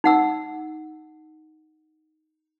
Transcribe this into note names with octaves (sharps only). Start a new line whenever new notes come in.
D#4 F#5 E6